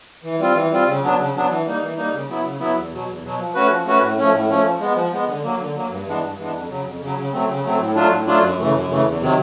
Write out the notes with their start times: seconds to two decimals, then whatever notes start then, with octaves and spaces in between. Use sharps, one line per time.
0.23 E3
0.39 G3 C4 F4
0.55 E3
0.71 G3 C4 F4
0.87 C#3
1.02 F#3 B3 D4
1.18 C#3
1.34 F#3 B3 D4
1.49 E3
1.65 G3 A#3 D#4
1.82 E3
1.97 G3 A#3 D#4
2.13 C#3
2.29 F#3 B3 E4
2.44 C#3
2.60 F#3 B3 E4
2.76 E2
2.91 B2 F#3
3.07 E2
3.23 B2 F#3
3.38 F3
3.55 A3 C#4 F#4 B4
3.70 F3
3.86 A3 C#4 F#4 B4
4.01 A2
4.18 F3 A3 C#4
4.33 A2
4.49 F3 A3 C#4
4.64 F3
4.80 G#3 B3
4.96 F3
5.12 G#3 B3
5.27 D3
5.43 F#3 A#3
5.59 D3
5.75 F#3 A#3
5.90 G2
6.06 E3 G#3 B3 D4
6.22 G2
6.38 E3 G#3 B3 D4
6.53 F2
6.69 C#3 F#3
6.85 F2
7.01 C#3 F#3
7.17 C#3
7.32 F#3 A3 C4
7.48 C#3
7.64 F#3 A3 C4
7.80 A2
7.95 F#3 A3 D4 F4
8.11 A2
8.26 F#3 A3 D4 F4
8.42 F#2
8.58 C#3 E3 A3
8.74 F#2
8.89 C#3 E3 A3
9.05 E2
9.21 C3 D#3 F#3